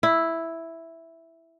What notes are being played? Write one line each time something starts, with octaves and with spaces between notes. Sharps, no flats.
E4